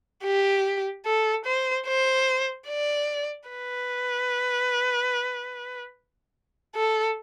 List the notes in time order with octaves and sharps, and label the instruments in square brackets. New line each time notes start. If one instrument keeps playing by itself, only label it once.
[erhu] G4
A4
C5
C5
D5
B4
A4